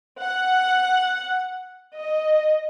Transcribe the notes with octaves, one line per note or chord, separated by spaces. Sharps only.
F#5
D#5